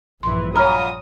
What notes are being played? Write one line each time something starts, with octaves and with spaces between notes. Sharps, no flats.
A#1 G2 E3 C6
F#2 A#2 C#5 A#5 B5 D#6 F6